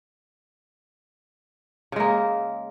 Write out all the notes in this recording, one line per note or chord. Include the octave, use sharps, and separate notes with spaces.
C#3 G#3 A#3